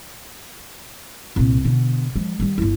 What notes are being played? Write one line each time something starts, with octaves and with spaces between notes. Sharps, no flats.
C2 A#2
B2 D3
F3 G#3
D#3 G3
G1 E4